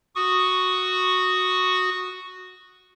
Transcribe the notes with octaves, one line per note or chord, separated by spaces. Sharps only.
F#4 C#6 D#6